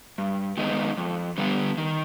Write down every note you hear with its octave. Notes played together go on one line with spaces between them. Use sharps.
G2
D#3 G#3 B3 D#4
F2
D3 G3 B3
D#3